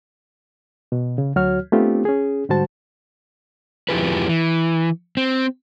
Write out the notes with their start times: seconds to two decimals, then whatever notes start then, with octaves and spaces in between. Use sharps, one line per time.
0.92 B2
1.18 C#3
1.36 D2 F#3 F#4 C#5 F6
1.72 A3 B3 C4 D4 F4 G4
2.05 C#4 G#4
2.49 G#2 D3 G3 F#4 C5 A5
3.89 F2 F3 E4 G4 G#4 B4
4.29 E3
5.17 C4